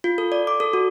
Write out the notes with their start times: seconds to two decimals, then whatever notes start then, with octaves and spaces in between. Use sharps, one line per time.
0.04 F4
0.18 A4
0.32 D5
0.47 D6
0.60 A4
0.73 F#4